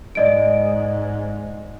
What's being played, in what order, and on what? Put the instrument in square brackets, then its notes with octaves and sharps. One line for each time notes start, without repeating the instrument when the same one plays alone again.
[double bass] G#2 [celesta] D5 D#5 D7